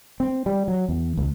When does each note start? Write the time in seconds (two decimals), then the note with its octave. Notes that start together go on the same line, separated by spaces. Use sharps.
0.20 C4
0.46 G3
0.68 F#3
0.89 E2
1.17 C#2